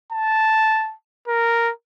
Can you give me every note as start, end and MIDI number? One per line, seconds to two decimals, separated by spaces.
0.12 0.94 81
1.28 1.71 70